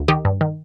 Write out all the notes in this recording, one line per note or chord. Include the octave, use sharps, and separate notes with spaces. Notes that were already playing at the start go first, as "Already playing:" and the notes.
Already playing: D2
D#3 D#4 G4
G2
D#3